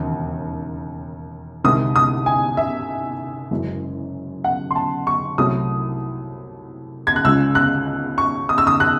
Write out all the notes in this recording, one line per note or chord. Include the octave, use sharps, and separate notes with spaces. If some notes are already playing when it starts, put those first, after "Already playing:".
Already playing: E1 D#2 C#3
C2 C3 D#3 G#3 D#6
D#6
G#5
E5
F#1 F#2 E3 G#3
F#5
C6
A5
C#6
C2 C3 F#3 A3 D#6
G#6
F#6
C#2 C#3 G#3 E6
F#6
C#6
D#6
E6
D#6
F#6